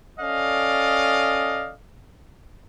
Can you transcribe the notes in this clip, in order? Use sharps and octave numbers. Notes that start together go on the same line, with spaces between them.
C#4 A4 D5 D#5 F5